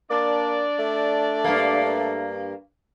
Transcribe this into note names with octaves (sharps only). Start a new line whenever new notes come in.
A#3 D4 D5
A3
G2 A#3